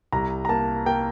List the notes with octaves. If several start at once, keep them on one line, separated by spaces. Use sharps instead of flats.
C2 A#5
A#5
A#3 A5
A#3 G5